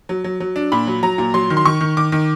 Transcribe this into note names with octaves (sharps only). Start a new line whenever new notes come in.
F#3
F#3
F#3
D4
A#2 B5
F#3
F#3 A#5
A#2
F#3 C6
D#3
C6
D#3 C#6
D#3
D#3 D6
D#3